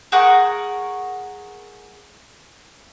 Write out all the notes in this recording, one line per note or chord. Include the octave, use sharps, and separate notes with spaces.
G#4 A#4 F#5 C#6